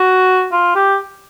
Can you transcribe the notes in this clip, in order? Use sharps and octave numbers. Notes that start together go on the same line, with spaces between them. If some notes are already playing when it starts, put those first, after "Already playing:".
Already playing: F#4
F4
G4